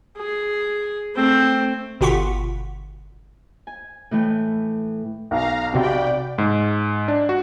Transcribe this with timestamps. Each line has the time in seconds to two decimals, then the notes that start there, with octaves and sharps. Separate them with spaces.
0.17 G#4
1.15 A3 C4
2.01 G1 B2 F4 F#5 C#6 B6
3.67 G#5
4.11 A2 E3 A3 G5
5.31 B1 F5 A#5
5.74 C3 C4 F#4 D5 G5 B5
6.38 G#2
7.08 D4
7.29 F#4